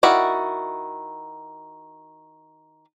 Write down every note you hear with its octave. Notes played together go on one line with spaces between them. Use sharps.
D#3 E4 F#4 D5